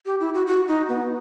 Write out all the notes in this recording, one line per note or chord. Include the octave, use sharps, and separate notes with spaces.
G4
E4
F#4
F#4
D#4
B3